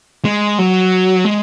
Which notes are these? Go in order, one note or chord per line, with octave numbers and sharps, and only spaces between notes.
G#3
F#3
G#3